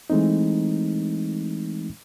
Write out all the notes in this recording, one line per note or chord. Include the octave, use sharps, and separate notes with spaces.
E3 G#3 A3 C4 D#4